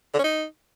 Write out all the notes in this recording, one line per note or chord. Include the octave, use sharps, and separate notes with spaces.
D3
C#4
D#4